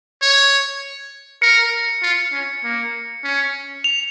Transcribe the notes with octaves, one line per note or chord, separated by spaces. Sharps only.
C#5
A#4 C#7
F4
C#4
A#3
C#4
F7